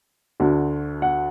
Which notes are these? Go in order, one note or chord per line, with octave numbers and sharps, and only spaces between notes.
D2 D3
F#5